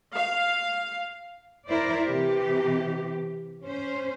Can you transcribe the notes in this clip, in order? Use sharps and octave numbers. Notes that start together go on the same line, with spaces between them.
F5
E4 A#4 C5 D5
C3 E3 G4
C#4 C5